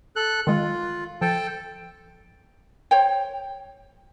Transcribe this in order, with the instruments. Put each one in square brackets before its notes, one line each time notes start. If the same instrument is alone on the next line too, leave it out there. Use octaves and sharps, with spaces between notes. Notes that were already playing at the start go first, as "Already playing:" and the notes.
[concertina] A4 F#6
[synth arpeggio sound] D#3 G#3 [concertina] F4
[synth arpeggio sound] F3 [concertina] A4 G5 A5
[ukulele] C5 C#5 G5